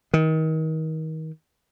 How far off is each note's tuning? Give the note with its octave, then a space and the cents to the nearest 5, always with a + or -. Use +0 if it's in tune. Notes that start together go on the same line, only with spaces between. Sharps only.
D#3 +30